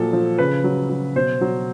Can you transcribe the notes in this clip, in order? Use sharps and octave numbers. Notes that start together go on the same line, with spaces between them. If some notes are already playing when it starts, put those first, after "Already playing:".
Already playing: A#2 F3 F#3 A4
F3
C#3 B4
F#3
F#3
B2 C5
F#3